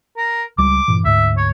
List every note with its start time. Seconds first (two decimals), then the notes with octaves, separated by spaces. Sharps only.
0.17 A#4
0.58 C#2 G3 D6
0.88 G2 A#2 E3
1.05 D2 G#2 E5
1.37 C#5